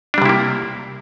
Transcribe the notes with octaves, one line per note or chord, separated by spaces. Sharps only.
C3 G3 A#3 D4 E4